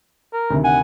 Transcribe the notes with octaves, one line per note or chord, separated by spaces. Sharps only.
A#4
D2 C3 D#3
F#5 G#5